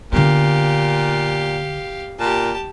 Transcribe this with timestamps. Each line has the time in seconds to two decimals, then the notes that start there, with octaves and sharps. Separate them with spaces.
0.12 A#2 D3 B3 G4 F5
2.20 A#2 G4 A5